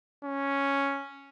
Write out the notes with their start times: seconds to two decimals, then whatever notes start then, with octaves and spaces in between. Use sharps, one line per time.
0.25 C#4